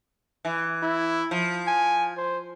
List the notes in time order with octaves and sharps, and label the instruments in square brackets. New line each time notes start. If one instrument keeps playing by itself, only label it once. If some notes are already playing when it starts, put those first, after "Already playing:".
[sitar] E3
[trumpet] E4
[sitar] F3
[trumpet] G#5
C5